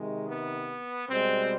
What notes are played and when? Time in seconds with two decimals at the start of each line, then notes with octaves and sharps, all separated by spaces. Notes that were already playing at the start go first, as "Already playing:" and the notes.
Already playing: C3 D#3 G#3
0.28 B3
1.09 B2 G3 G#3 C4